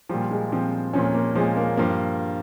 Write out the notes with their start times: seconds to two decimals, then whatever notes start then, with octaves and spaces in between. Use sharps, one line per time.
0.09 A#2 F3 G3
0.31 G#3
0.52 A#2 F3 C4
0.93 A#2 F3 C#4
1.14 A#3
1.35 A#2 F3 G#3
1.57 A#3
1.77 G2 F3 A#3